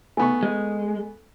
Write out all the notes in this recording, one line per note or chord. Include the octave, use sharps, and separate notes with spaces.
A3 B3 A4 G#5 C#6
G#3